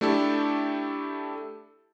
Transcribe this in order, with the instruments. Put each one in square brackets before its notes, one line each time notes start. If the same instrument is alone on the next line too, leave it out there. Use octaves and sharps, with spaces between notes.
[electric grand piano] A3 D4 E4 G4 A4